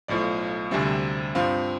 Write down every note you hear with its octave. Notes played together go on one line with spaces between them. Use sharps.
B1 A2 F3 D5
D2 C3 G3 C4 E5
G2 F3 C4 F5